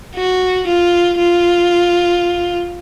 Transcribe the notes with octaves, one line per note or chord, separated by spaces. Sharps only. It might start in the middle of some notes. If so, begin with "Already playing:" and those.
F#4
F4
F4